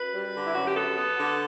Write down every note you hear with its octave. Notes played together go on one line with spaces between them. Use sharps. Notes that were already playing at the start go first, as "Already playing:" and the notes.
Already playing: F#2 B4
G3
D3
E4
F#2 F#4
G4
B3 A4
B3
D3